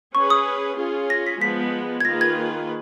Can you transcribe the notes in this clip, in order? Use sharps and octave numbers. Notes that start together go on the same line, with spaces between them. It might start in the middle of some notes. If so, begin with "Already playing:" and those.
C#4 G#4 B4 C#6
D#6
C#4 F4 G#4
A#6
B6
F3 G#3 B3 B6
G#6
D#3 A#3 F4 G#4 B4 A#6
G#6